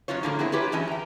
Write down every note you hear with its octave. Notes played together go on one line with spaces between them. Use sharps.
F#2 F#3 C#4 F4 C#5
A2 D3 F3 A#3 G#4 A#5
B3 C4 E4 G#4 A#4 C#5
F4 G4 G#4 B4 C#5
F#2 A2 E3 C#4 D#5 A5
G5 A#5